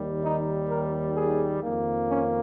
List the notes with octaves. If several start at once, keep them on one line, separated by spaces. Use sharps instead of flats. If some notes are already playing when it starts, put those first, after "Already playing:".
Already playing: D#2 D#3 G3
D#4
A#4
G#4
F2 D#3 A#3
C#4